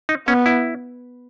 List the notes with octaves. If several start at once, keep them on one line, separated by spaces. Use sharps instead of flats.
D#4
B3 C#4
E4